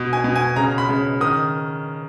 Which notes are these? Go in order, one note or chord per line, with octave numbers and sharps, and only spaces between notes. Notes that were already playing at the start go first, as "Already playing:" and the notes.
Already playing: B2
G#5
B2
G#5
C#3 A#5
B5
C#3
D#3 D#6